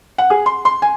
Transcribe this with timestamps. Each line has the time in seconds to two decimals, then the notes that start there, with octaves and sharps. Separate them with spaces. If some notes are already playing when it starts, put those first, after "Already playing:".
0.18 F#5
0.30 G#4
0.46 C6
0.65 C6
0.82 G#5